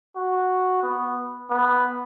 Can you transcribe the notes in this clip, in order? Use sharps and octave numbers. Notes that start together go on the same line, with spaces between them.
F#4
B3
B3